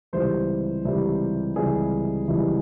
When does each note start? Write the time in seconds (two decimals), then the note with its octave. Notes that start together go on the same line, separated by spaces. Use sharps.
0.13 C#2 C3 E3 G3 C5
0.85 C#2 C3 E3 G3
1.56 C#2 C3 E3 G3 G#4
2.28 C#2 C3 E3 G3